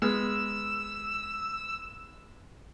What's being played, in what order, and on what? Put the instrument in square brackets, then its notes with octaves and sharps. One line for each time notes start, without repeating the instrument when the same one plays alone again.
[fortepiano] G#3 B3 F6 [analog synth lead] E6